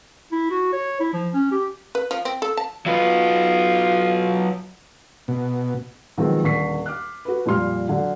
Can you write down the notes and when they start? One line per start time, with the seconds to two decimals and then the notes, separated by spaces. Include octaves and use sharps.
0.32 E4
0.51 F#4
0.73 C#5
1.00 E4
1.13 F3
1.34 C#4
1.52 G4
1.95 B4
2.11 F3
2.25 C4
2.42 A4
2.57 A5
2.86 F#3 F4 F#4 B4
5.28 B2
6.17 B2 D#3 F3 F#3 G#3 C4
6.43 D#1 D3 C#6 B6 C7
6.86 D6 F6 F#6
7.25 F#4 B4
7.46 F2 A#2 G3 C6 F6
7.89 D3 F#3